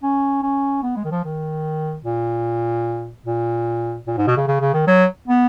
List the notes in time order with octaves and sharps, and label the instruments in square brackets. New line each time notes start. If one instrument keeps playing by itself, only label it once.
[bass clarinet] C#4
C#4
B3
G#3
D#3
F3
D#3
A#2
A#2
A#2
G#2
B2
C#3
C#3
C#3
D#3
F#3
B3